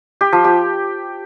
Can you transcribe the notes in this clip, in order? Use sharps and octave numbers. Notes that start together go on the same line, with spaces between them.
G4
F3
G4